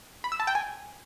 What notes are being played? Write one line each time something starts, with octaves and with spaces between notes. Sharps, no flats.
B5
E6
A5
G5
G#5